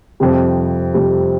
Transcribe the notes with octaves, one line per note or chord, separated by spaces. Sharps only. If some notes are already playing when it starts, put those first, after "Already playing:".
F2 C3 G3
F2 C3 G3